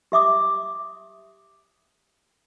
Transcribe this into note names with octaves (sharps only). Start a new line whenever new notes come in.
G4 E5 D6 D#6